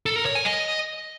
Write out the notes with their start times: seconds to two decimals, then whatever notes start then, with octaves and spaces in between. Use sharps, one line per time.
0.06 A4
0.16 A#4
0.25 C#5
0.35 G#5
0.45 D#5